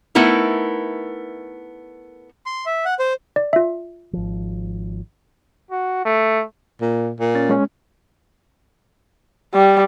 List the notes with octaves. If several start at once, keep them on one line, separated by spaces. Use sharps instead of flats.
A3 B3 D#4 E4 A#4
C6
E5
F#5
C5
D5
F4 E5
G#1 F3
F#4
A3
A#2
A#2
C#4 A6
G#3 C#4
G3